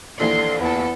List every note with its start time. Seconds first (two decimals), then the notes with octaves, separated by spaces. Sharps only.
0.20 A#1 D#2 D3 E3 C6
0.60 E2 B3 A4